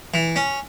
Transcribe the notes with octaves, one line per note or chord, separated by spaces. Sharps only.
E3
C#4